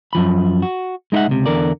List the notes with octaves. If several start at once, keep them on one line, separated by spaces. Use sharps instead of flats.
F#2 F3 B5
F#4
G#3 D#4 A#4 E5 F#5
C#2 C3
E2 D3 A#4 D5